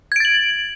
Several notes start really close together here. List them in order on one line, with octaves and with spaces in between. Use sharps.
G#6 D7 A6 F#7